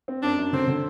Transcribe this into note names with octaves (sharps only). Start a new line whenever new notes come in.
C4
F#2 D4
F#2
D3 C4
D3